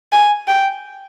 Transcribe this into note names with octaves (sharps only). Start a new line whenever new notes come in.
G#5
G5